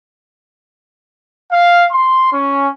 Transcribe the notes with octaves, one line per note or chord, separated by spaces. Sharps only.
F5
C6
C#4